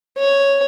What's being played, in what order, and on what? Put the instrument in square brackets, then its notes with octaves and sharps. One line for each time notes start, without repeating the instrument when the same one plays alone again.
[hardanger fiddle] C#5